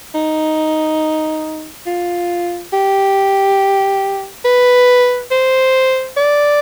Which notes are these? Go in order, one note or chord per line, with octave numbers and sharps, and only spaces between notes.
D#4
F4
G4
B4
C5
D5